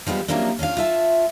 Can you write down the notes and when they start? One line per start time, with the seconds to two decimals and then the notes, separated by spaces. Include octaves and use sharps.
0.07 F3 G3 G#3 B3
0.28 C3 F3 F#3 A#3 C#4 D4
0.59 C#4 D4 F4 F5
0.77 F4 E5 A5